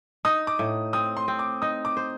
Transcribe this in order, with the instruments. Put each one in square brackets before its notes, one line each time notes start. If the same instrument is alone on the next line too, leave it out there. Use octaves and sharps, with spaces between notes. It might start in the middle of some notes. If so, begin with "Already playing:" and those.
[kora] D#4 [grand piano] D#6
[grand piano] D6
[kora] A2
[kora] C4 [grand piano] D#6
[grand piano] C6
[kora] C4
[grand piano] D6
[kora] D#4 [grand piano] D#6
[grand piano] D6
[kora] C5